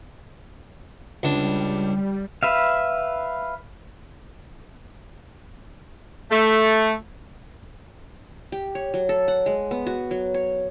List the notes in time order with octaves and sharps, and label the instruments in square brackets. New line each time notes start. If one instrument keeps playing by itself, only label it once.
[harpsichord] C#2 D4 [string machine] G3
[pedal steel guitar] B4 E5 F5
[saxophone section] A3
[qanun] G4
C#5
F#3
A4
F#5
G#3
B3
F#4
F#3
C#5